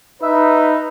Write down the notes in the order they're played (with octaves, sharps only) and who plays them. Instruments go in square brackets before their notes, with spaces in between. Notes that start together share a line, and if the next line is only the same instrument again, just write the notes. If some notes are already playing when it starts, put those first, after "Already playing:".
[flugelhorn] D#4 [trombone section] B4 [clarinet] E5